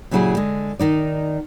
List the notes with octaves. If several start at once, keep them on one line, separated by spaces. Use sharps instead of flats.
A#2 C#3 F#3 E4 G4 G#4
D3 G#3
D#3 D#4 D5